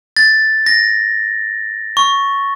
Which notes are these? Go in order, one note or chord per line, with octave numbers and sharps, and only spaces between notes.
A6
A#6
C#6